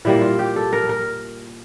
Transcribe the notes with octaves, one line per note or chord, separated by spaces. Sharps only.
A#2 G3 A#3 E4
F4
G4
A4
A#4
A#4